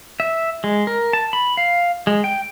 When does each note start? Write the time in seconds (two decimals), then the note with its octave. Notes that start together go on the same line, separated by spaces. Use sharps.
0.20 E5
0.64 G#3
0.87 A#4
1.13 A5
1.33 B5
1.57 F5
2.07 G#3
2.24 G5